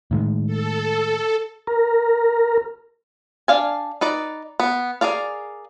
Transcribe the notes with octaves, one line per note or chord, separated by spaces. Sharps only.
A2 D#3 G#3
A4
A#4
D4 F5 G#5
D#4 B4 D5
B3
G#4 A#4 D5 F5